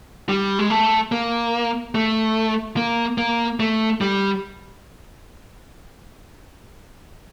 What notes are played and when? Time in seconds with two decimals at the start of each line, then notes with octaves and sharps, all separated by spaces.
0.29 G3
0.59 G#3
0.70 A3
1.12 A#3
1.95 A3
2.77 A#3
3.18 A#3
3.60 A3
4.01 G3